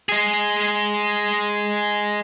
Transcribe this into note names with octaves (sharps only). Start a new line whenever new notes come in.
G#3 G#4